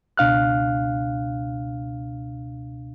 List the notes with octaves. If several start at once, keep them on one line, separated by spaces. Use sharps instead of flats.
C#2 B2 D4 F5 F6 F#6